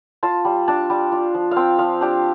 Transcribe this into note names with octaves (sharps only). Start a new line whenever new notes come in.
F4 A5
G3
D4 A5
G3
F4
F3
F5
C4 G5
F3 F5
D4 G4